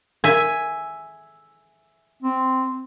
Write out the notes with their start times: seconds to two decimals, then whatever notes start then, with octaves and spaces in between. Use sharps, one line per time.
0.24 E5 G#5
2.22 C4